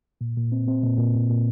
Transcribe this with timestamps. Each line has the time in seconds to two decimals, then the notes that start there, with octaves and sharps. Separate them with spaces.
0.21 A#2
0.37 A#2
0.52 C4
0.68 C4
0.83 A#2
0.98 A#2
1.15 A#2
1.30 A#2